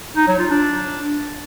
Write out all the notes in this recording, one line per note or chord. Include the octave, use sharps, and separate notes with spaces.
D#4
F#3
F4
D4